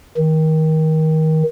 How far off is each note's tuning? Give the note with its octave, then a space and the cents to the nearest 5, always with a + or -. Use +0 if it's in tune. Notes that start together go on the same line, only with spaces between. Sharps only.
D#3 +25